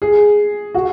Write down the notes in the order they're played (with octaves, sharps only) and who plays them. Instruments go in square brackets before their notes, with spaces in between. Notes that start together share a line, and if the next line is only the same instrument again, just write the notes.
[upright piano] G#4
F#4